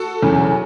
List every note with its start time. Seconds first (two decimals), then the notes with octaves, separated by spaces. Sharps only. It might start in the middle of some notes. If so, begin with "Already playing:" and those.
Already playing: F#4 A4
0.23 E2 C#3 F#3